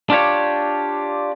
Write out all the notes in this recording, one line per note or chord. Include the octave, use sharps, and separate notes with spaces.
D4 F4 G4 C#5